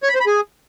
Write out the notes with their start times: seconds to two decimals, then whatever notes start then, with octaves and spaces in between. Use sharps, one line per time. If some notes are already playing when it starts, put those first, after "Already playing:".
0.03 C#5
0.09 B5
0.15 C5
0.20 B5
0.26 G#4